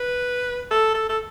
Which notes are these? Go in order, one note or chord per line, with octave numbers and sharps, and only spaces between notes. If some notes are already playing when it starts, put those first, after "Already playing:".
Already playing: B4
A4
A4
A4